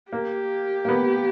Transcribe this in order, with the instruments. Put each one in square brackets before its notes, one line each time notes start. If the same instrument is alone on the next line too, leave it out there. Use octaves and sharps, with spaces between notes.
[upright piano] A#3 [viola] G4
[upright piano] A#3
B3